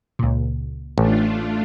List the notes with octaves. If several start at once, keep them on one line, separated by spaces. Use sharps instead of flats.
C#2 A#2
A1 A3 D4 F4